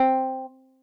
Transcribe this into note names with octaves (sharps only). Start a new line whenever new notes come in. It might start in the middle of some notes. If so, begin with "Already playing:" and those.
Already playing: C4